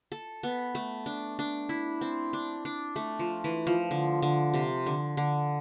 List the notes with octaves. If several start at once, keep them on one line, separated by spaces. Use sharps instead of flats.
A4
B3
A3
D4
D4
E4
C4
D4
D4
A3
F3
E3
F3
D3
D3
C3
D3
D3